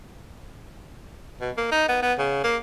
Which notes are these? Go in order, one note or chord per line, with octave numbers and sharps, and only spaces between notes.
B2
A#3
D#4
B3
B3
C#3
A#3